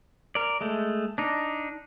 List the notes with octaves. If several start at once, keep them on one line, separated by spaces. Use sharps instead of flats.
A#4 D5
G#3 A3
D4 D#4